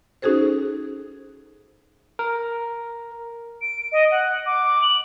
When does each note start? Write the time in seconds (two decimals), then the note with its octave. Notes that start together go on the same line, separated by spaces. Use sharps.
0.22 C#4 D#4 F#4 G#4 A4 C5
2.19 A#4
3.61 D7
3.92 D#5
4.11 F#5
4.46 D6
4.82 F#7